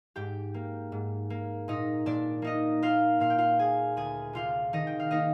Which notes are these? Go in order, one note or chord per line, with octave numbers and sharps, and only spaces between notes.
G#2 G4 G5
A#3
G#2
A#3
A#2 D#4 D#5
A#2 D4 D5
A#3 D#4 D#5
A#3 F4 F5
A#2 F5
G5
F4 F5
A#3 G#4 G#5
D2 G#4 G#5
C3 F4 F5
D#3 D#4 D#5
G5
F5
A#3 D#4 D#5